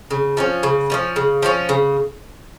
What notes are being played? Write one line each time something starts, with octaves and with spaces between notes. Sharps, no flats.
C#3
F3 A3 C#4
C#3
F3 A3 C#4
C#3
F3 A3 C#4
C#3